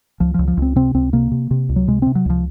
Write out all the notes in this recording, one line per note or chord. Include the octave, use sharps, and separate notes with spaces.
C#2 F3
C#2 F3
F3
C#2 C4
C3 C4
C#2 C4
C3 A#3
C3
C3
C#2
F#3
C3 G#3
C3 C4
F#3
C#2 F3